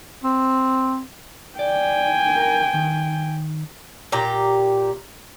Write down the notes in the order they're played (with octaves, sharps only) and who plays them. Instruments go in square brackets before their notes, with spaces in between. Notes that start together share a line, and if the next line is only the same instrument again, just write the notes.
[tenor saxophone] C4
[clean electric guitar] D5 [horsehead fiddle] G5 G#5
[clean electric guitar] A#4
D#3
[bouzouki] A#2 G4 A#5